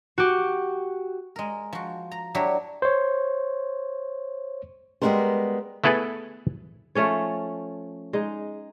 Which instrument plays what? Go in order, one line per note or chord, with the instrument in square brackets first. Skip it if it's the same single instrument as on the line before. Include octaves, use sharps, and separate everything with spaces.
[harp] F#4 G4
[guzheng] G#3 A#4
F3 F#4
A#5
F#3 D4 E4 G4
[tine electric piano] C5 C#5
[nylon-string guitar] G3 G#3 B3 D4 A#4 C5
[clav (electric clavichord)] A3 B3 E4 G#4 A4 B4
[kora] F3 A3 C#4 C#5
G#3 D#4